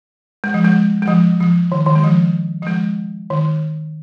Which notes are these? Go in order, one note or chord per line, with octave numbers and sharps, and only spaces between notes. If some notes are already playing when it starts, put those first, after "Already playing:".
G#3
F3
G#3
G#3
F3
F3
D#3
D#3
G#3
F3
F3
G#3
D#3